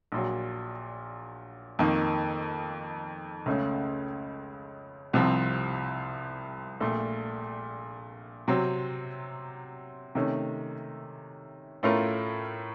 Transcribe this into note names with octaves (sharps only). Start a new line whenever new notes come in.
A#1 A#2 F#3
F2 D#3 A#3
C#2 C#3 A3 C#4
C2 C3 F3 C4
A#1 A#2 A3
C3 F#3 C4
C3 D#3 A3 C#4
A2 A3 C#4 F4 A#4